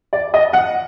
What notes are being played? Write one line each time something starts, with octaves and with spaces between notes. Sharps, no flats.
D5
D#5
F#5